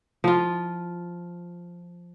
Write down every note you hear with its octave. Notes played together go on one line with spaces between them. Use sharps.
F3 F4